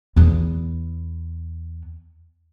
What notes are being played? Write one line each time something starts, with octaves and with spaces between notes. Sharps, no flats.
E2 B3